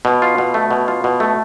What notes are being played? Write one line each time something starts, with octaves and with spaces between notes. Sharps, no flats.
B2
F4
B2
A3
B2
F4
B2
A3